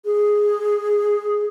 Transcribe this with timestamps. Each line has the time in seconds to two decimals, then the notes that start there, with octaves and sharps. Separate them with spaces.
0.05 G#4